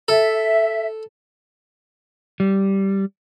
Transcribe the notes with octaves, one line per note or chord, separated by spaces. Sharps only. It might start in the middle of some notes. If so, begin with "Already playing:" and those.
A4 E5
G3